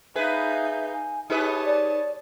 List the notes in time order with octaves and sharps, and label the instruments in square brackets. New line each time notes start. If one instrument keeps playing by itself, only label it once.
[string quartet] D#4 F5 G6 [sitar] G#4 B4 [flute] E5
[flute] G#5
[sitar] D#4 G#4 B4 [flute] G4 [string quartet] C#5 A5 D#6
[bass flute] D5